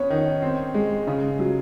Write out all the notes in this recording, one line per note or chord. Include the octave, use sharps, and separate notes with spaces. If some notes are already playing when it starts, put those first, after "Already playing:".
Already playing: B3 C#4 C#5
D#3
C4
G#3
C#3
F#3